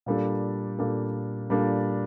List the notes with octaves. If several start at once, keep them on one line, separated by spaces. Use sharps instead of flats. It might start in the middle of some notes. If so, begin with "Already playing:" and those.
A#2 G3 A#3 D4 A4
A#2 G3 A#3 D4 A4
A#2 G3 A#3 D4 A4